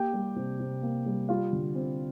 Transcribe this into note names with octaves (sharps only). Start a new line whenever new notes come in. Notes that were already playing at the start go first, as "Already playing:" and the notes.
Already playing: A#3 G4 G5
G3
C3
C3
A#3
G3
G3 F4 F5
D3
C4